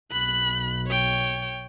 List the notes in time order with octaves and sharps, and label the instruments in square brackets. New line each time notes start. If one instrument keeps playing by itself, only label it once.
[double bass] B1 [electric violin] B5 F#6
[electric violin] C#5 G5